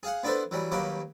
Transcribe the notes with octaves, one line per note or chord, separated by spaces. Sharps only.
G#4 F5 F#5
B3 D4 E4 A4 B4 C5
E3 F#3 G3
D#2 F#3 G3 A#3 B4 D6